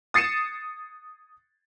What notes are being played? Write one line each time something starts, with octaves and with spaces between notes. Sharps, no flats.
D#6 A6 C7 C#7 D#7 E7